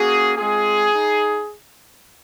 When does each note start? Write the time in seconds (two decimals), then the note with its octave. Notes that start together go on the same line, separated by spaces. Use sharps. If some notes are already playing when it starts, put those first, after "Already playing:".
Already playing: A#3 C#4 F#4 G#4
0.37 G#3 C4 F4 G#4
0.93 D#4